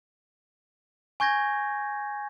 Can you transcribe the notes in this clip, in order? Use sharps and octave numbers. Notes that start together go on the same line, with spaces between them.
G#5 C#6 G6 G#6 A#6